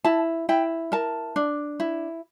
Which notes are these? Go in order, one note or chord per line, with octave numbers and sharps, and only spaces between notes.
E4 A5
E4 G5
A#4 A5
D4
E4